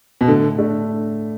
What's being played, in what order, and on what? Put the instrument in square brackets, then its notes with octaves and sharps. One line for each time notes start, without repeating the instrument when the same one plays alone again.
[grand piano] B2
[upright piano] A2 [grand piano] D3
[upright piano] A3 D4